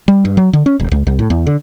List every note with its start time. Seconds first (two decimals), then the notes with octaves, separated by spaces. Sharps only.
0.08 G3
0.25 G2
0.37 F#3
0.53 D3
0.66 C#4
0.80 D#1
0.91 C#2
1.07 C2
1.19 A2
1.30 E2
1.47 D3